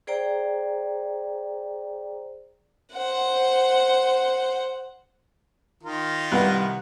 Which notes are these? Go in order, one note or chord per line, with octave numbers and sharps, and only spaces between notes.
G#4 C5 D5 G5 A#5
C5 F#5
D#3 F4 A#4
C2 B4 F#5 F#6